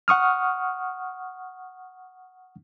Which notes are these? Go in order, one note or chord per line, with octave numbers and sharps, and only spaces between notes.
F#5 C#6 D#6 F6